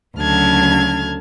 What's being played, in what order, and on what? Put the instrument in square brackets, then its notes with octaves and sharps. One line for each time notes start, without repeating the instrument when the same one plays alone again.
[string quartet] D2 C#3 F#3 A5 F6 G#6